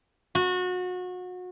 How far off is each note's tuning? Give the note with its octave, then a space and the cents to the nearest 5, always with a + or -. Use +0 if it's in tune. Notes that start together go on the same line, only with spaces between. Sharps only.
F#4 -30